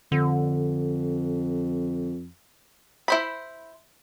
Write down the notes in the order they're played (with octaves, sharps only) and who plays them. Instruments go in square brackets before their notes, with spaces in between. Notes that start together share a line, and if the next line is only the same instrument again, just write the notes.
[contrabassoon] F2 [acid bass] D3
[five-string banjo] E4 C5 B5